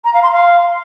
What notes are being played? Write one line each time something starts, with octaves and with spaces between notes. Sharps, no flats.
A#5
F5
C6
F5